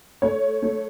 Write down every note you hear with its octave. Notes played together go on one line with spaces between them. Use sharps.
A3 C#5
A3